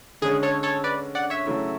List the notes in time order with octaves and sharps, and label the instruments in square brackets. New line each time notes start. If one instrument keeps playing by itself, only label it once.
[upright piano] D3 G#3 C#4 [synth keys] G#4
[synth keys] A4 C#5
A4 C#5
B4 D5
D5 F#5
C#5 E5
[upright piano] C#3 F#3 A3 E4